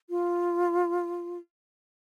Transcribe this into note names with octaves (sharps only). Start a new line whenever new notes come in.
F4